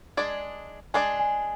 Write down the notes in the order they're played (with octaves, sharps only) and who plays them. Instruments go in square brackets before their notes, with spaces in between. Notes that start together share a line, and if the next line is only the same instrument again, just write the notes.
[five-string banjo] G#3 D4 G#4 D5
[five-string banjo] G#3 D4 G#4 D5 [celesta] G#5
[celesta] G#5